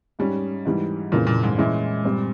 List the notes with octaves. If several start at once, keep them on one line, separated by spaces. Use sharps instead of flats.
G#2 G3 C#4
G#2 E3 G3
F2 A#2 C#3 E3 A#3
A#2
G#2
A#2 E3 G#3 C#4 E4
G2 G3 C4